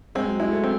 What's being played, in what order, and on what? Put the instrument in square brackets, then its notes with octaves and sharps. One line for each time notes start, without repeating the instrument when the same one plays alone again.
[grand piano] G#3 [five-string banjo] C4
[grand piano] F#3
[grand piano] G#3 [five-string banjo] E4
[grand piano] A3
[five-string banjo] C4